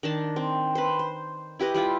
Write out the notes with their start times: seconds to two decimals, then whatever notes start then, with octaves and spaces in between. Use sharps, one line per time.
0.03 D#3 D4 A5
0.36 C4
0.75 B4 C5
0.99 C5
1.59 E4 G4 B4 D#5
1.74 G3 E4 F4